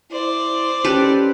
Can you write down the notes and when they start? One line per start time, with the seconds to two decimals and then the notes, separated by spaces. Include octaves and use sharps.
0.11 E4 C5 D5
0.84 C#4 G4 A4 B4